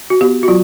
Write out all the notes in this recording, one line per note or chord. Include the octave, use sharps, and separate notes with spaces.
F#4
B3 G4
F#4
F#3 F4